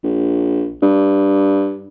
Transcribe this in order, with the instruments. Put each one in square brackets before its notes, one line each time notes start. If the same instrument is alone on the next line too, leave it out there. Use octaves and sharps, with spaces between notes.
[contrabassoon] A#1
G2